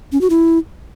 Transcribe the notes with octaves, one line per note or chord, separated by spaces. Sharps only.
C#4
F#4
E4